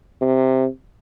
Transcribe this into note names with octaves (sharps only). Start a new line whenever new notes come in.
C3